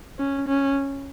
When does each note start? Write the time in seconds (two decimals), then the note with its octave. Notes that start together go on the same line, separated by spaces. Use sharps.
0.19 C#4
0.48 C#4